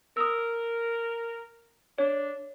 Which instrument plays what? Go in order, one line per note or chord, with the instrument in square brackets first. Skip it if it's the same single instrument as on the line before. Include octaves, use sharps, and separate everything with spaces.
[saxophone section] A#4 [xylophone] D#6 E6
[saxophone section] D4 [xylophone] C#5